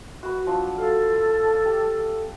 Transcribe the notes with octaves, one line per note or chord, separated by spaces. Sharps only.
F#4 B4
F3 F#3 D4
A4 F5
D5
G4